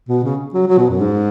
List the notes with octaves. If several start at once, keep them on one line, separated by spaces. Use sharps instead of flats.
B2
C#3
F#3
F#3
B2
F#2
G#2